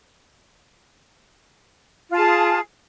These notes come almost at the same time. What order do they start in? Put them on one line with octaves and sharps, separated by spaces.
F4 A5 G#4